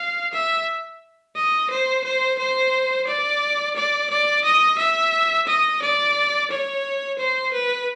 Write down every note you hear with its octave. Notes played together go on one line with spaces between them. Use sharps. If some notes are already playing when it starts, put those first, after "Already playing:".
Already playing: F5
E5
D#5
C5
C5
C5
D5
D5
D5
D#5
E5
D#5
D5
C#5
C5
B4